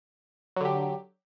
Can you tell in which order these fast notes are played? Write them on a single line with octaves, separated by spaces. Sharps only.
F#3 D3 G4